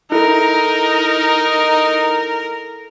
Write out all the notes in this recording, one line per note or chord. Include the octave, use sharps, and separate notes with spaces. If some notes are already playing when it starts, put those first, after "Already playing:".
D#4 E4 A4 A#4